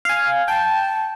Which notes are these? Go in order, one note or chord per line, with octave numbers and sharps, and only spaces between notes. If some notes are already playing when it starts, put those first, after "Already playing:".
F5 G#5
G5 A5